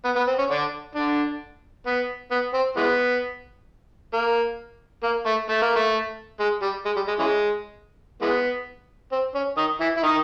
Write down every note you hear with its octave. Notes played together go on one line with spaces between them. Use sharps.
B3
B3
C4
C#4
D3 D4
D3 D4
B3
B3
C4
E3 G#3 B3
A#3
A#3
A3
A3
A#3
A3
G#3
G3
G#3
G3
G#3
C#3 E3 G#3
E3 G#3 B3
C4
C#4
D#3 D#4
E3 E4
E4
D#3 D#4